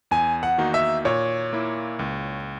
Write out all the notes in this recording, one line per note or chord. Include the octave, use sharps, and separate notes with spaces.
E2 G#5
F#5
D#3 A#3 D#4 F#4
E5
A#2 C#5
A#3 E4
C#2